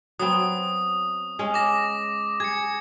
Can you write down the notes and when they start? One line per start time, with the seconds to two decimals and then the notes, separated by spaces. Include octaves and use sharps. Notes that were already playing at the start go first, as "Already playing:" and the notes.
0.19 F#3 B3 C4 D#6
1.39 G#3 C#4
1.54 D6 A#6
2.40 G#4 G#6 C#7